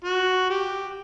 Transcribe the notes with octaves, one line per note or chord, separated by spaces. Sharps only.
F#4
G4